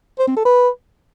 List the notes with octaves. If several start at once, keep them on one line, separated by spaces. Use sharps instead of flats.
C5
C4
A4
B4